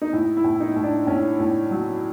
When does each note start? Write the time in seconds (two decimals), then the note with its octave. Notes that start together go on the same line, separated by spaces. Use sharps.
0.02 D#4
0.13 A2 E4
0.37 E4
0.44 A2
0.60 D#4
0.76 A2
0.83 D4
1.07 A2 C#4
1.40 A2
1.71 F#3